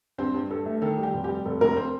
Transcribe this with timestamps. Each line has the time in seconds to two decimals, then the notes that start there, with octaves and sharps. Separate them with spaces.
0.18 G2 C4 C5
0.34 G2
0.50 G2 A4
0.66 A3
0.82 D#3 A4
0.97 G3
1.03 G4
1.13 F1
1.24 G3 G4
1.45 F1 A4
1.61 F1 A#3 A#4
1.76 C4 C5